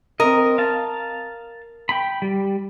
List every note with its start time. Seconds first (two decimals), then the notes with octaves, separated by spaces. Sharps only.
0.20 C4 A#4 D#5
0.58 F5 A5
1.89 G5 B5
2.22 G3